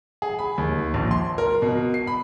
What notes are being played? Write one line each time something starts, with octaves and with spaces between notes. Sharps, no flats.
G#4
B5
D#2
A#1
C6
A#4
B2
C7
B5